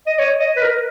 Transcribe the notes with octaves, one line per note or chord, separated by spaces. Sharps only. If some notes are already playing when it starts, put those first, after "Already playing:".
D#5
C#5
D#5
B4
A#4